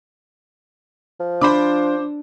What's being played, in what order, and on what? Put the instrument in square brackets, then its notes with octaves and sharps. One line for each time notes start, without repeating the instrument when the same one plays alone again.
[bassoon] F3
[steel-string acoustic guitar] D4 [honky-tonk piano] C5 B5 D6